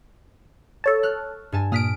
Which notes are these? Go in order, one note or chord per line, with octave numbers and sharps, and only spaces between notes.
A4 C#5 A5
F6 F#6
G2 G#5 A5
A#2 D#6 F6 B6 D7